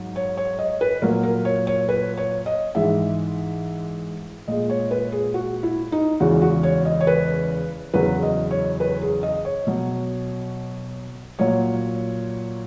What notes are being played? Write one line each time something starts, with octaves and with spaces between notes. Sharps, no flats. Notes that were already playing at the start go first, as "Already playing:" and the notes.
Already playing: G#2 F#3
C#5
C#5
D#5
B4
A#2 F#3 A#4
A#4
C#5
C#5
B4
C#5
D#5
G#2 E3 G#3 E5
A#2 G#3 D#5
C#5
B4
G#4
F#4
E4
D#4
E2 C#3 E3 G#3 F#4
F#4
C#5
D#5
C#5
B4
E2 C#3 F#3 B4
D#5
C#5
B4
G#4
D#5
C#5
B2 F#3
A#2 F#3 C#5